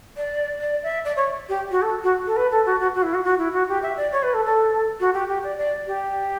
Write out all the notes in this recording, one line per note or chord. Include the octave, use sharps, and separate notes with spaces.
D5
D5
E5
D5
C#5
G4
F#4
A4
F#4
A4
B4
A4
F#4
F#4
F#4
E4
F#4
F#4
E4
F#4
G4
E5
D5
C#5
B4
A4
A4
F#4
G4
G4
D5
D5
G4